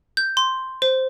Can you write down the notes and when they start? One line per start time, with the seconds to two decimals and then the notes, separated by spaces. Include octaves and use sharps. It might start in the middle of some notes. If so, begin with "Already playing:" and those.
0.17 G6
0.37 C6
0.82 C5